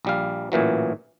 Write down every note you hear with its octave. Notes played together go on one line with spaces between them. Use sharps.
A#1 G3 F5
A1 A#2 E3 F#3